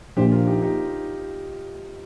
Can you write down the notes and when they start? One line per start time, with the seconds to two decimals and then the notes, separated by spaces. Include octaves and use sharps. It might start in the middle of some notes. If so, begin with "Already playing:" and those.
0.16 A#1 A#2 F3 G4 C5
0.32 F4 A#4
0.47 D#4 G4
0.62 D#4 G4